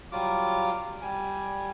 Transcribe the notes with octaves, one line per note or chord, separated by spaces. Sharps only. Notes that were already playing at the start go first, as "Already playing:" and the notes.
F#3 G3 F4 D6
G3 G#5